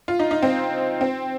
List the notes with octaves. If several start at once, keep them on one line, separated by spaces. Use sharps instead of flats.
F4
D#4
D#4
C4
C4